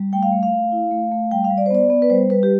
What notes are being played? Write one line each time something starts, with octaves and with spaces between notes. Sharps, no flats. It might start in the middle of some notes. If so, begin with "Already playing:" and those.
Already playing: G3
A3 G5
F5
A3
F5
A3
E4
A3
A3
G3 G5
F5
G3
D5
C5
B3 D5
B3
B4
G3 C5
G3 B4
G4